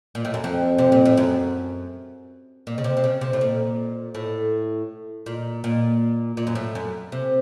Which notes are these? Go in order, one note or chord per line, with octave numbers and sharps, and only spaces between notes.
A#2
A2
F#2
F2
C3
A#2
A2
F#2
A#2
C#3
C3
C3
C#3
C3
A2
A#2
A2
A#2
A#2
A#2
F#2
A2
F#2
C3